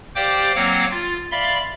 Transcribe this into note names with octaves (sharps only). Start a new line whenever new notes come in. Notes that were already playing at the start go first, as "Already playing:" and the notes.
G4 C5 D5 F5 G5 D6
F#3 A#3 C4 C#5 F5 F#5
F4 A6
D5 E5 F5 B5 C6